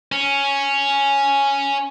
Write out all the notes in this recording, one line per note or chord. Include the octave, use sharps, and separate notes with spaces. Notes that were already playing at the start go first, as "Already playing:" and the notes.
C#4